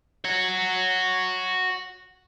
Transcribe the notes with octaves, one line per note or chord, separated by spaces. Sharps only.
F#4 C#5